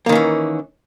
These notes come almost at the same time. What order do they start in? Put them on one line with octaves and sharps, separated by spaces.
A#3 D#3 C#4 E3